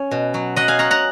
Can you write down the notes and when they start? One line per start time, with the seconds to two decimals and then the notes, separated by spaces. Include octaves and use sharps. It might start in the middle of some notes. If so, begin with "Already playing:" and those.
Already playing: C#4 C#5
0.11 B2
0.34 F#3
0.56 F#3 D#5 F#5
0.68 F5 G#5
0.79 C#4 F#5 A#5
0.91 F#5 A#5